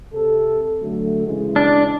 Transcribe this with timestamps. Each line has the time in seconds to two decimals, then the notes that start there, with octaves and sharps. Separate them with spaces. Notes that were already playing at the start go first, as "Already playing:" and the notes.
0.14 C3 A4
0.81 D3 F#3 A3
1.27 C#3 E3 G#3
1.56 D4